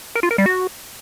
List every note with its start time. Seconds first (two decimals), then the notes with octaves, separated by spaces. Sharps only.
0.15 A#4
0.23 F4
0.31 A#4
0.38 G3
0.46 F#4